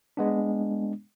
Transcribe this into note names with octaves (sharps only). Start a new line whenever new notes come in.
G#3 B3 D4